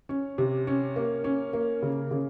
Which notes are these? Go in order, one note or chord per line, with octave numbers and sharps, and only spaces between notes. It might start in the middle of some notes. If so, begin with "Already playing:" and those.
C#4
C3
C#4
A#3
C#4
A#3
C#3
C#3